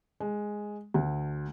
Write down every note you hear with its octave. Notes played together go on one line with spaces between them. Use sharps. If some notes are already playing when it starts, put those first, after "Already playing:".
G#3
D2